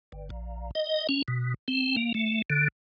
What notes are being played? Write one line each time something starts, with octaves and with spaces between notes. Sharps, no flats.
G1
A#1
D#5
C#4
B2
C4
A#3
A3
D3